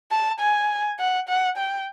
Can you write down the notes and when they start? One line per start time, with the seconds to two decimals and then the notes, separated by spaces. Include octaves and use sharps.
0.11 A5
0.40 G#5
0.99 F#5
1.29 F#5
1.57 G5